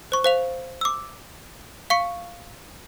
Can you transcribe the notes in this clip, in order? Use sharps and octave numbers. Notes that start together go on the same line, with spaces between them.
C5 C#6
C5 F5 F7
D6 E6
F5 C#6 C#7